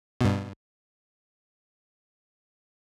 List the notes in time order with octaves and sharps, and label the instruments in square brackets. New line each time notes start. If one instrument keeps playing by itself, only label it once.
[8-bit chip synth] G2 B2